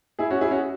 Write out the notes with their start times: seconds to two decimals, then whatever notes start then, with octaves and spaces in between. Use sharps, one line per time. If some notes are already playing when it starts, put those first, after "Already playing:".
0.19 E4 G#4
0.30 C#4 F#4
0.41 E4 G#4
0.51 C#4 F#4